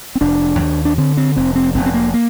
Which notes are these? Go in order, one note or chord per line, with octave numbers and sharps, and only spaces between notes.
C4
F1 D4
D#2
D4
D3 C4
C4
F1 C4
C4
F1 C4
C4
A#3
A#3